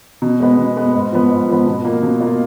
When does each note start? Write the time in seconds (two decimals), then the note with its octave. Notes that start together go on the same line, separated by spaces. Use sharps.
0.22 B2
0.40 G#3 B3
0.57 B2
0.77 G#3 B3
0.95 G#2
1.13 F3 B3
1.30 G#2
1.49 F3 B3
1.66 B2
1.85 A#3 F4
2.03 B2
2.20 A#3 F4